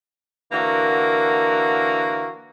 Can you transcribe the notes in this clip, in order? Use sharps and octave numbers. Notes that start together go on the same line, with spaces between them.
D3 E3 A#3 F#4 A#4